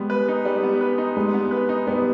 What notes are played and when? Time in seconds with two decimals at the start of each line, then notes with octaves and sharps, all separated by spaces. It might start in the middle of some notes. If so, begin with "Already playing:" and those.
Already playing: G3 G#3 B3
0.10 B4
0.28 D#4
0.45 G3
0.63 B3
0.81 B4
0.98 D#4
1.17 G3 G#3
1.34 B3
1.51 B4
1.69 D#4
1.87 G3 B3